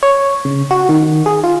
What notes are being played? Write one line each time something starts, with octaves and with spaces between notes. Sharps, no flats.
C#5
C#3
F#4
D#3
G#4
F4